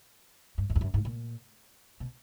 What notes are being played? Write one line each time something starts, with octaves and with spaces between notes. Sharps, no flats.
G2
F#2
F2
F#2
G#2
A#2
B2